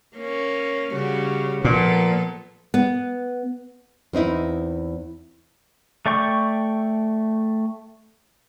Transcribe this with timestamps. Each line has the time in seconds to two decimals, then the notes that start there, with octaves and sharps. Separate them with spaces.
0.17 A#3 C#4
0.92 C#3 G3 F#4
1.65 A#2 F3 B3 A4
2.74 B3
4.13 E2 C4 D#4 E4
6.06 A3 D5 G5 C#6